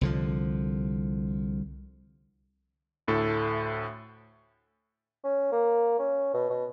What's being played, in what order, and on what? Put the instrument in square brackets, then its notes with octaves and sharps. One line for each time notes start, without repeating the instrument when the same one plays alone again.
[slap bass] C2 D3 F3
[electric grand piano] D2 A2 A4
[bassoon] C#4
A#3
C#4
B2
B2